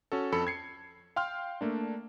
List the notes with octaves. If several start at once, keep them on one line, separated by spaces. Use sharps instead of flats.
C#4 F#4 A4
F2 A4 B5 C#7
G#6 C7 C#7
F5 G5 C6 F6
A3 A#3 D4